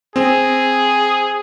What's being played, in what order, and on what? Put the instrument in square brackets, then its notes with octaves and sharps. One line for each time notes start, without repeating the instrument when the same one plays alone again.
[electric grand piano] C4 [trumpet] G#4